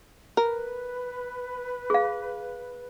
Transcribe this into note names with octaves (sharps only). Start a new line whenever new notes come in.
A#4 B4
G#4 F5